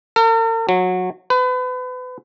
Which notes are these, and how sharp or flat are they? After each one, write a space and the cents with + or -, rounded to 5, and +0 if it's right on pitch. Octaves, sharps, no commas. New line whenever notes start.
A#4 -45
F#3 -20
B4 +35